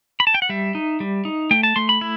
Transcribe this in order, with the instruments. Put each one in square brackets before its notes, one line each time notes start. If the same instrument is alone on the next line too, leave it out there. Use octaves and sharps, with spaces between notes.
[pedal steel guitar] B5
A5
G5
F#5
G3 E5
D#4
G3
D#4
A3 G5
A5
A3 C6
B5
E4